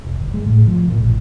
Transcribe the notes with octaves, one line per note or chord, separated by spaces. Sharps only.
E1
G1
G#3
A2
F3
A#2
A1